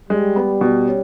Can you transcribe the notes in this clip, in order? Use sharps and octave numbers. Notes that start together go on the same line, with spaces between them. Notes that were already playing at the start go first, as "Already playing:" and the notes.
G3 G#3
B3
B2
C#4